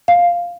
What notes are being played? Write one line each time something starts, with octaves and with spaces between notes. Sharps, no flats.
F5